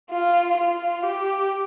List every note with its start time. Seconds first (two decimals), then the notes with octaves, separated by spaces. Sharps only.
0.11 F4
0.57 F4
1.03 G4